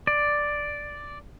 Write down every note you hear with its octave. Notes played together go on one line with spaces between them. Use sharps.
D5